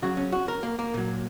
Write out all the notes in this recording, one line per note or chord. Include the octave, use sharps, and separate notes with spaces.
C#3 F#3 F#4
C#4
F#4
A#4
A#3
A#3
A#2 F#3